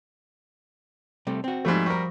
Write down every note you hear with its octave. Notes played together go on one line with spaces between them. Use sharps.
C3 G3 A3
C4 F#4
G#2 F3 G3 A3
G3 A#4 C#6 D#6 A#6